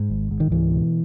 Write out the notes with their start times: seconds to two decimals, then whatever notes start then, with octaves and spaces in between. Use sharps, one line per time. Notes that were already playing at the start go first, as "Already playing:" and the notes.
Already playing: G#2
0.10 G#1
0.31 G#2
0.40 D#3
0.51 C#2 E3
0.71 B2